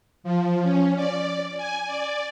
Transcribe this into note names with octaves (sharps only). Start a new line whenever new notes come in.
F3
C#4
D5
G#5
D5